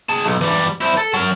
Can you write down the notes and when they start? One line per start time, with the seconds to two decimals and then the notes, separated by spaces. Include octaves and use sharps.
0.09 G#4 A5
0.24 B1
0.41 E3 G3
0.81 E4 C5
0.97 A4
1.14 F#3 A#4